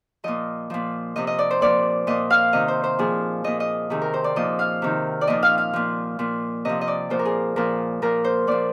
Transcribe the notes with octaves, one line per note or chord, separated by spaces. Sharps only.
A#2 F3 D#5
A#2 F3
C3 F3 D#5
D#5
D5
C5
A#2 F3 D5
A#2 F3 D#5
F5
C3 D#3 D#5
C5
C5
A#2 F3 G#4
A#2 F3 D#5
D#5
C3 D#3 G#4
A#4
C5
D5
A#2 F3 D#5
F5
C3 D#3
D5
A#2 F3 D#5
F5
F5
A#2 F3
A#2 F3
C3 F3 D#5
D#5
D5
A#2 F3 C5
A#4
G#4
A#2 F3 A#4
A#2 F3 A#4
C5
A#2 F3 D5